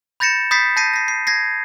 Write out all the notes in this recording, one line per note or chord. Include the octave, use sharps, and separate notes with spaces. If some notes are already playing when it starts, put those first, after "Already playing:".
B5 G6 A6 A#6 C#7 E7
B5 D#6 G6 A6 B6 C7
A5 G6 A#6 C7 D#7
A#6 C7
C7
G#6 A#6 C7